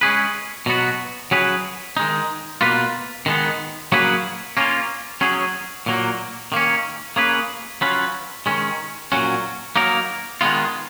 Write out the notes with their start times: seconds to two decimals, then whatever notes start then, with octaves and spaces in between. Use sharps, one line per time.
0.01 G#3 C#4 G#4 B4
0.66 B2 F#3 B3 F#4
1.31 F#3 C#4 G#4 B4
1.97 D#3 G#3 D#4
2.61 B2 A#3 F4 B4
3.26 D#3 G#3 B3
3.92 F#3 A#3 C#4 G#4 B4
4.57 A#3 C#4 F4
5.21 F#3 C#4 G#4
5.86 A#2 F#3 A#3
6.52 D#3 A#3 C#4
7.16 A#3 C#4 G#4 B4
7.81 F#3 C#4 F4 B4
8.46 D#3 G#3 C#4
9.12 A#2 F#3 C#4 F#4
9.76 F#3 A#3 D#4 A#4
10.41 D#3 G#3 B3 F4